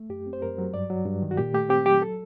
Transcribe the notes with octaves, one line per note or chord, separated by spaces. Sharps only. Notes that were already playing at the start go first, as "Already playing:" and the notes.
Already playing: A3
F#2 G4
C4
C5
F#2 A#4
F#3
G2 D5
F#3
G2
D#3
F#4
A#2 G4
A3 G4
C4 G4
F#3 G4
A4